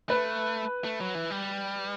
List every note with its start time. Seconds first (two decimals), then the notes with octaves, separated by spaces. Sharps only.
0.09 A3 B4
0.84 A3
1.00 F#3
1.15 E3
1.30 G3